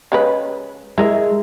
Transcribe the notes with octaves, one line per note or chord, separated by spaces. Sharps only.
C#3 G#3 B4
G#3 E4 A#4 E5